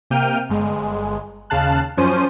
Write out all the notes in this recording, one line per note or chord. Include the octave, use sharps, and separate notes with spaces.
C3 A#3 G5 F6 D#7
G1 G#3
D#2 C#3 F5 A5 F#6
F#2 F3 C#4 C5 D#7